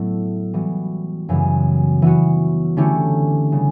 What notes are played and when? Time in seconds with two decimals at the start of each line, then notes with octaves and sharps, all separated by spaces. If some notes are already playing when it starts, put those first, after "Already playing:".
Already playing: A2 F#3 A3 B3 E4
0.53 E3 G3 B3 F#4
1.29 F#2 C#3 E3 G3 B3
2.02 E3 B3 F#4
2.77 D3 A3 C#4 E4 G4
3.52 C#3 G3 B3